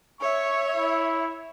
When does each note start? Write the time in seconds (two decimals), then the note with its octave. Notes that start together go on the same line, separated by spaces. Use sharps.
0.21 C#5 E5 C#6
0.74 E4